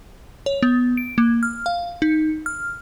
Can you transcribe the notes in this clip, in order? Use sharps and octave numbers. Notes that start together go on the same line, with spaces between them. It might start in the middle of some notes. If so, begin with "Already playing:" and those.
C#5
B3
D7
A#3
F6
F5
D#4
F6